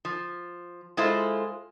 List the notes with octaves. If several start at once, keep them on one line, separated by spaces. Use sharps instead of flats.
F3
G#3 E4 F4 A4 C5